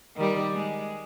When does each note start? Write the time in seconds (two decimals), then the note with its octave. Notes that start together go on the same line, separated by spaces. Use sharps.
0.16 D#3 G3
0.54 G#3